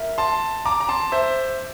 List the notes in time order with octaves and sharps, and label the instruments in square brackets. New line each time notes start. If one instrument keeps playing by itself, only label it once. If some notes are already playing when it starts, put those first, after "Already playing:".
Already playing: [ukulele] A#4 E5
[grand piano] A5 C6
A#5 D6
A#5
A5 C6
C5 E5